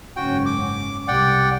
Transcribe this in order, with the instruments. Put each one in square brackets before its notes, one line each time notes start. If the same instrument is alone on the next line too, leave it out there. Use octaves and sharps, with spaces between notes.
[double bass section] F#1 G#2 C#4 [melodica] F#4 G5
[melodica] D6
[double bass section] C2 G3 [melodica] D5 F#5 G5